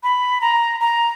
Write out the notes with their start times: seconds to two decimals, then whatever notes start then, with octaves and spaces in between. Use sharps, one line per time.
0.03 B5
0.41 A#5
0.80 A#5